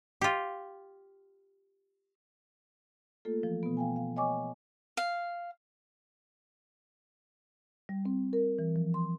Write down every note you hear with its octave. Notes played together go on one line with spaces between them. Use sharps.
F4 G4
A3 A#3 F4 A4
E3 F3
B2 B3
F5 G5 G#5
F5
C#5 D#5 G5 G#5 C#6 D6
F5
G3
C4
A#4
E3
F3
C6